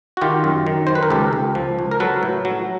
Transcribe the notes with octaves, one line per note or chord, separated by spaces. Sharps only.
F#4
D#3 F4 G4
F#2
D#3
D#3 C5
B4
A#4
C#2 G4 A4
C#2
F3
C#2
A#4
F#3 A4 B4
A2
F#3